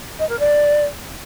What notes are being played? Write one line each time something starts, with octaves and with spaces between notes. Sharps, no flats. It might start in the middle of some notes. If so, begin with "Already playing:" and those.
D#5
A#4
D5